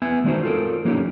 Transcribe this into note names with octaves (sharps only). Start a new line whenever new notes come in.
B3 E5 G#5
D#3 G#3 D4 D#4 F#4 C5
F4 A4 A#4
F3 A#3 C#4 D#4 G4